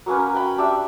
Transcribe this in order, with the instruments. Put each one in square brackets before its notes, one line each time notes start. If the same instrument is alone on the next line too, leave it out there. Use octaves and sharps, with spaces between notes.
[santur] F#3 A#3 C#4 B4
G5 B5
D4 G4 D5 E5